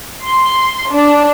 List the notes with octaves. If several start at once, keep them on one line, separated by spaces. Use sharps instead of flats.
C6
D4